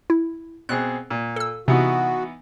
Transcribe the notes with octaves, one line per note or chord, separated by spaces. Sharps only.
E4
B2 C4 G#4 F#6
A#2
A4 E6
C3 E3 B3 D#4 F#4